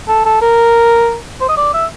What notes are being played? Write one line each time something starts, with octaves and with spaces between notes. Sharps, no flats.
A4
A4
A#4
C5
D#5
D5
E5